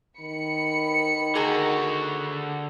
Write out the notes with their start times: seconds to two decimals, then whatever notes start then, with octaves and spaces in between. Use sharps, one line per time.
0.20 D#3 B5 C#7
1.35 D3 F#4 G#4 A#4